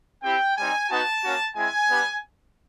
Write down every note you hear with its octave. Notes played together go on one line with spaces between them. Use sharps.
C4 E4 G4 G5
G3 C4 D#4 G#5
B3 D#4 F#4 A5
A#3 C#4 F#4
G#3 C4 E4 G#5
G3 B3 D4 G4